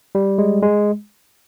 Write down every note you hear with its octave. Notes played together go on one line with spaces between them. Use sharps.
G3
G#3
G#3